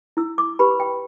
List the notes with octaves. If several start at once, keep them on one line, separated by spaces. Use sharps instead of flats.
E4 E6
D6
G4 B4 B5
G5